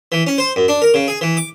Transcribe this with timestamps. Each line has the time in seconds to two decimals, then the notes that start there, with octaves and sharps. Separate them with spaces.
0.12 E3
0.27 C#4
0.38 C5
0.56 F#2
0.68 D4
0.82 A#4
0.94 C#3
1.08 G#4
1.21 E3
1.37 D6